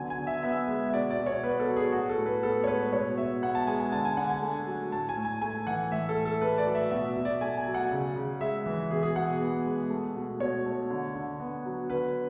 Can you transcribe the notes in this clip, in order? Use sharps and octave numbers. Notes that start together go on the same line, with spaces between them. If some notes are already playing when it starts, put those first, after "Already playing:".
Already playing: D3 F#3 B3 G#5
G#5
D3
E5
B3 E5
G#3
E5
B2 D5
D5
B2
C#5
B3 B4
A4
F#3
G#4
A2 F#4
A4
A2
B4
B3 A4
C#5
G#3 B4
B2 C#5
B2 E5
B3 F#5
A5
G#3 G#5
G#5
D3 A5
G#5
D3 F#5
G#5
A3
F#3
A2 A5
G#5
A2
G#5
A3 G#5
E3 F#5
A2 E5
A4
A2
A4
A3 B4
D5
F#3
E5
B2 E5
B2
D5
A3 G#5
G#5
F#3
F#5
C#3
C#3
G#3 E5
E3
B2 G#4
G#4
B2 F#5
B3
G#3
A3
B2
B2 C#5
A3
D3
D3
B3
F#3
D3 B4